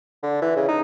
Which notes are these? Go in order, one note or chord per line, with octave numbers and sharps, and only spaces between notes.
D3
E3
C#3
D#4